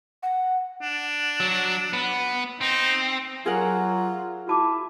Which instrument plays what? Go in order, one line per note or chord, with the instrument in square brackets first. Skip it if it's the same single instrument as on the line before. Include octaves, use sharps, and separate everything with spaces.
[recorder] F#5
[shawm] D4
[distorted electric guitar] F#3
B3
[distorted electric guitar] C4 [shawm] D#4
[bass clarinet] F#3 [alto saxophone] F4 [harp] G#4 A#4 F#5
[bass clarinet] E4 [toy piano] F#4 A5 D6